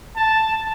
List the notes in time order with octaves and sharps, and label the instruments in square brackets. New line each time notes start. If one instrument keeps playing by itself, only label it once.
[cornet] A5